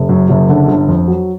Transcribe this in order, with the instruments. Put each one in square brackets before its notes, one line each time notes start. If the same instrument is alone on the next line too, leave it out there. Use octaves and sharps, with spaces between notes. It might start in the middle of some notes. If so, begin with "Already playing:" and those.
Already playing: [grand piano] F#1
F#2
F#1
D3
G1
F2
F#3